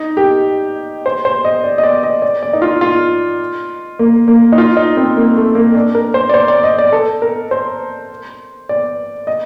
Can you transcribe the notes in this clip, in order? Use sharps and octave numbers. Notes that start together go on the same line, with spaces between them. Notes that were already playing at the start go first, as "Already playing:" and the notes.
Already playing: D#4
G4
C5
C5
D#5
D5
D#5
D5
D#5
D5
D5
D#4
F4
F4
A#3
A#3
D#4
F4
D#4
C4
A#3
A3
A#3
D4
A#4
C5
D5
C5
D5
D#5
D5
A4
A#4
C5
D5
D#5